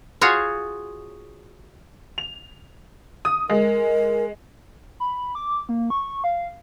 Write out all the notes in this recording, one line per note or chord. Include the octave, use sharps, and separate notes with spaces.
F4 F#4 G#4 C#5
F7
D#6
G#3 A#4
B5
D6
A#3
C#6
F5